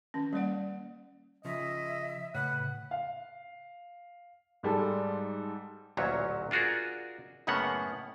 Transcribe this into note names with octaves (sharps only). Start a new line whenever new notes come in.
D#3 C#4
G3 A#3 D5 F#5
C#3 F3 D#5 E5
A2 C#3 B4 F#5
F5
G#2 G3 G#3 A4
A1 D2 A#2 F#3 C#4 C#5
D4 F4 F#4 G#4 A#4
F#2 A2 C#3 A#3 B3 F#5